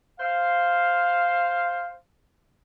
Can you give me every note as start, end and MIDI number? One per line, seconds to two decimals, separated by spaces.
0.20 1.96 72
0.20 1.96 77